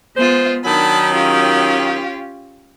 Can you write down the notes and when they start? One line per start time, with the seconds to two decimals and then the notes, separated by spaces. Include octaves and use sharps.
0.16 G#3 B3 F4 C5
0.64 D#3 F#3 D4 A5 B5
1.11 C#4 F4 G4